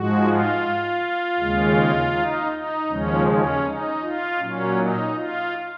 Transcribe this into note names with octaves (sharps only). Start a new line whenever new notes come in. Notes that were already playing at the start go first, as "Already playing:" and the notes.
Already playing: G#2 F3 G#3 F#4
F4
D#2 C#3 G#3
D#4
D#4
D#2 C#3 F3 G#3 C#4
C#4
D#4
F4
A#2 F#3 C#4
D#4
F4